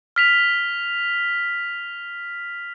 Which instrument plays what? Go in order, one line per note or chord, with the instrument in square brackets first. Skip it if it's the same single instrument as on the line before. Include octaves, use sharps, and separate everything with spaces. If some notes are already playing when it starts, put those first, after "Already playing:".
[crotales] F6 B6 F7